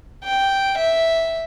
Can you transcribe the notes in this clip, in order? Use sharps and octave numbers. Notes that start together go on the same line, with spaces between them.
G5
E5